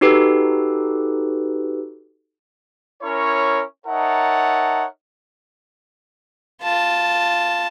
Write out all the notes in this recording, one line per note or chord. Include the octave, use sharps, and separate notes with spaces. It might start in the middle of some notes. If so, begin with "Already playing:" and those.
D#4 F#4 G4 A4 B4
C#4 E4 A#4 C#5
D#4 A#4 C#5 E5 F#5 A5
F4 A5